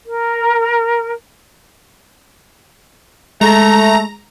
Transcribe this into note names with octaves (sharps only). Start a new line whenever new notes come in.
A#4
G#3 A3 A#5